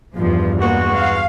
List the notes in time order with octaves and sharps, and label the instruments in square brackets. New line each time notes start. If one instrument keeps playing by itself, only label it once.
[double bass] E2 G2 [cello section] F3
[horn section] G#3 B3 F#4 [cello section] A#3
[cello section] F5